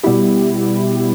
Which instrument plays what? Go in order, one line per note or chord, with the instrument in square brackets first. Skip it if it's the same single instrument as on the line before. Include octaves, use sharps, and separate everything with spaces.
[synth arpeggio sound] B2 G3 B3 E4 G4